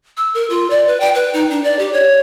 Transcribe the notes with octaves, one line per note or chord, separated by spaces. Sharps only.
E6
A#4
F4
D5
B4
G5
B4
D#4
D4
D5
G4
C#5